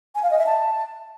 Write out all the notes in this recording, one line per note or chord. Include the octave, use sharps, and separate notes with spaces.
G#5
F5
D#5
E5
A5